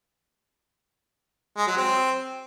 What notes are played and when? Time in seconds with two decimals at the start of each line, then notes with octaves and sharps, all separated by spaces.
1.57 G#3
1.67 F#3
1.77 C4